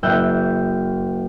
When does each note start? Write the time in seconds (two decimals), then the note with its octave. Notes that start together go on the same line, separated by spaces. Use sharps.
0.03 F#1 E5 G5 E6 F#6 G6